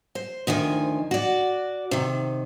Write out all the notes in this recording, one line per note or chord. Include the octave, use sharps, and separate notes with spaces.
C5
D2 D#3 F3 G#5
F#4 D5
C3 D#3